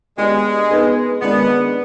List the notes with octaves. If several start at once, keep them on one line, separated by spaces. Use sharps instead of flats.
G#3 B3 D4 G4 D5
B3 D#4 G#4 B4
D#3 G#3 B3 D4 G#4 D5